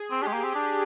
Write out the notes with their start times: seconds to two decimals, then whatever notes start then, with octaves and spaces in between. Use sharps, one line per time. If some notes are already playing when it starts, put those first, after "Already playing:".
Already playing: G#4
0.11 C4
0.22 D4 G4
0.27 G#3
0.33 A#3
0.44 C4
0.55 D4